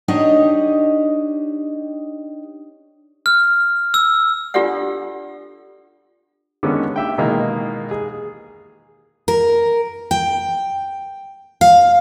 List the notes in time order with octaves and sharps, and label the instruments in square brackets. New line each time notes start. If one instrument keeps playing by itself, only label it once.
[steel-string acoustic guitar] D4 D#4 G4 C#5 D#5 F#5
[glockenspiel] F6
E6
[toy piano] D4 F4 G4 A4 D5 F#5
[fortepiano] D3 D#3 G#3 B3 C#4
G4 E5 G5
B2 D#3 E3 G#3 A#3
G#4
[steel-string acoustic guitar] A#4
G5
F5